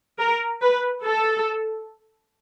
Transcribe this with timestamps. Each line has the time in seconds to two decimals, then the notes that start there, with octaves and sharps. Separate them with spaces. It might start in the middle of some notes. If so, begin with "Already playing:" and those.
0.19 A#4
0.61 B4
1.04 A4